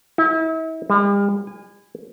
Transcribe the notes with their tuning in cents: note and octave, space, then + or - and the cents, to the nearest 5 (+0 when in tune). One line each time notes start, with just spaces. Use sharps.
E4 -40
G3 +45
G#5 -20